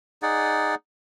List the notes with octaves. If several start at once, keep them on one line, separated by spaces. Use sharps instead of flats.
D#4 G#4 D5 F#5